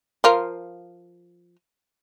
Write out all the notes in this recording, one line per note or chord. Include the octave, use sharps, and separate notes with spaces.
F3 F4 A#4